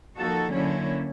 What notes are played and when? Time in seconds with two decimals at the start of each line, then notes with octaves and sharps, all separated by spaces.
0.18 F3 A#3 D#4 F#4 A4
0.53 D3 F#3 A#3 C#4 E4